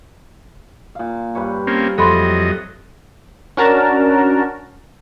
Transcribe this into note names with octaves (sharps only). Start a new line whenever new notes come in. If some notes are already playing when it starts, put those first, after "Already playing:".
A#2 F5
G2 B4 C#5
A#3 C4 C#4
F2 C3 F#3 A4 D#5 B5 C6
C#4 D4 F#4 A#4 A5 A#5